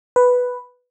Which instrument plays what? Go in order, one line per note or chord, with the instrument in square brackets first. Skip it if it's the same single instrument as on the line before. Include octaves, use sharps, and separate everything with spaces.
[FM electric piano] B4